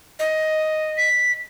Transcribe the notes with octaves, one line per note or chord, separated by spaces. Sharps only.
D#5
B6